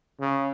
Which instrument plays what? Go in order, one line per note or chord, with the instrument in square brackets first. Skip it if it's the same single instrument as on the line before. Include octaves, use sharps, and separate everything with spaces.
[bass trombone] C#3